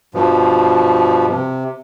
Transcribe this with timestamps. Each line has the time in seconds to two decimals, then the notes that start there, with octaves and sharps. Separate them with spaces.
0.14 G2 B2 F3
1.29 C3